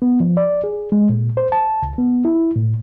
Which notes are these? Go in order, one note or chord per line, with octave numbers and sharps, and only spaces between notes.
B3
F3
D5
G#4
G#3
A#2
C5
A5
C#2
B3
E4
A2